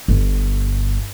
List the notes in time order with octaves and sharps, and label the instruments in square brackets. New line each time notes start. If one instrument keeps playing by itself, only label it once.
[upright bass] G1